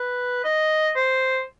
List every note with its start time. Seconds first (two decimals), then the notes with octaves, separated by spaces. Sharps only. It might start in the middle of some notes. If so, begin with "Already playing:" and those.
Already playing: B4
0.45 D#5
0.96 C5